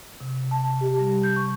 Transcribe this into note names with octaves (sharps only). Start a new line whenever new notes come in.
C3
A5
G4
G3
G6
C#6